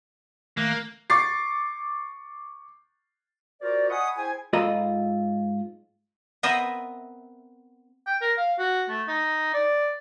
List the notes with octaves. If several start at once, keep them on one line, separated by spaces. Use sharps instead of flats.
D#3 A3 A#3 F#6
C#6 D6 A6 C7
F4 F#4 A#4 C5 D5
D#5 F#5 G#5 B5 C#6 D#6
E4 G#4 C5 G5 G#5
G#2 F4 A4 D#5 A#5 B5
B3 C4 A#4 B4 D#5 E5
G5
A#4
F5
F#4
A3
D#4
D5